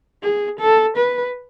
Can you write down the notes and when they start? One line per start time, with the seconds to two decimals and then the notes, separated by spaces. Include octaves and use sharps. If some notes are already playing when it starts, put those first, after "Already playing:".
0.23 G#4
0.60 A4
0.97 B4